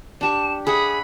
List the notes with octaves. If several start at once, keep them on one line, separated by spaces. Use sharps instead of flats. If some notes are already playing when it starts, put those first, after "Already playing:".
D4 G4 A5 C#6
G#4 B4 E5 F#5 B5 D#6